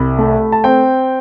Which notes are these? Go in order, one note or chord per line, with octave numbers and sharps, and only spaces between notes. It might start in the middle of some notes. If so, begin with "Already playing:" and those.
Already playing: C2 B5
A3
A5
C4 G5